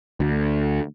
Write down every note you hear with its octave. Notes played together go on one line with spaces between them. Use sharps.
D2